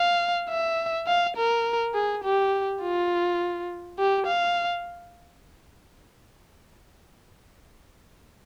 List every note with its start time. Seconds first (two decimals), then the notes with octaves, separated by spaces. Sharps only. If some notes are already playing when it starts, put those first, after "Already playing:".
Already playing: F5
0.50 E5
1.07 F5
1.37 A#4
1.95 G#4
2.24 G4
2.82 F4
3.99 G4
4.27 F5